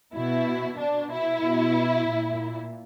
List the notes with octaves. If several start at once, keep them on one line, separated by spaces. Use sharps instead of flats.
B2 E4
B2 D4
E4
B2
A#2